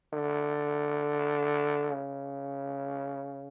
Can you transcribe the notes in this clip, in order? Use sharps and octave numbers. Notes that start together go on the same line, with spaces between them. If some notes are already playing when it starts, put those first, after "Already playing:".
D3
C#3